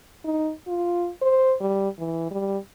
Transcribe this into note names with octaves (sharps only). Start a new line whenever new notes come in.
D#4
F4
C5
G3
E3
G3